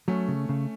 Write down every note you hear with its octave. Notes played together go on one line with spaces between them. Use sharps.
F#3 A3 C#4
C#3
C#3